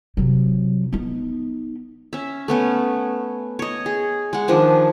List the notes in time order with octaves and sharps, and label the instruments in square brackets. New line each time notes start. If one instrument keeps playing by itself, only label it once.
[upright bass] C3 F#3
B3 D#4
[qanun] C#4 E5
A3 B3 C#4
C#5 D#5
G#4
G#3 F#5
D#3 F3 D4 D#5